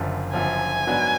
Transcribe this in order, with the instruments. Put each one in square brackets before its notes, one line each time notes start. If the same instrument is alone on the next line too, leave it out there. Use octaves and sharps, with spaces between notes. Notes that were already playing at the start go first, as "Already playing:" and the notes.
Already playing: [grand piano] F#1 F#2 D3 F3
[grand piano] F#1 F#2 D3 F3 [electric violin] G#5
[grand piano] G#2 F#3 B3 D4